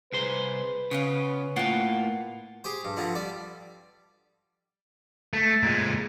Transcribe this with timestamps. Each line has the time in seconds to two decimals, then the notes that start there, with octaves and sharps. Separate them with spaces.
0.12 C2 G#4 B4 C5
0.91 C#3 B3 C#4 F4
1.56 A2 A#3 F4 F#5 G5
2.64 G4 G#4 C5
2.85 G2
2.97 D3 F3 B3 C4
3.15 G3 D5
5.33 A3
5.63 A#2 G#3